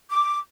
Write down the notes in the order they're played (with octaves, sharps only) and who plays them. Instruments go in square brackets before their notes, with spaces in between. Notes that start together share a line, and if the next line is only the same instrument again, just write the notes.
[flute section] D6